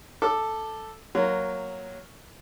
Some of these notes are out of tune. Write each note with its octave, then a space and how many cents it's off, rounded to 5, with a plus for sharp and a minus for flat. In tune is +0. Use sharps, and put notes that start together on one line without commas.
A4 +0 D6 +10
F#3 +0 A#3 +0 C6 -30